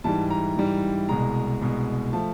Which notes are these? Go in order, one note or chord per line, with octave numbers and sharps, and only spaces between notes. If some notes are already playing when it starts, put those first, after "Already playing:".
G#2 E3 G3 A5
A#5
G#2 E3 G3
C2 B2 G#3 A#5
C2 B2 G#3
F3 A3 A5